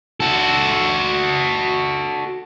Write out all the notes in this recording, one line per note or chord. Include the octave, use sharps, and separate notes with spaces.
F#4 A4